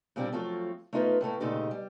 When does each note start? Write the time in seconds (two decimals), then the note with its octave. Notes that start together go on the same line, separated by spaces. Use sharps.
0.16 A#2 G3 A#3 C4 D4 G4
0.32 F3 F#3 A3 C4 F4 A4
0.93 A3 B3 D#4 F4 A#4 B4
1.21 A2 G3 A3 A#3
1.40 A#2 C#3 G#3 A3 D#4 G4
1.71 G3